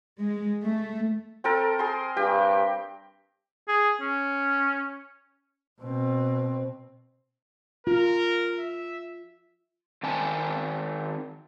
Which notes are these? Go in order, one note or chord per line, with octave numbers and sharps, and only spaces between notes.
G#3
A3
C4 A4 A#4
G#4 C6
G2 G4
G#4
C#4
B2 C4
F4 A#4
E5
D#3 C4 D5 G#5 A5